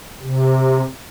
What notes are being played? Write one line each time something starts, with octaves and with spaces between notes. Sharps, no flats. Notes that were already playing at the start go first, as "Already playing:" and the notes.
C3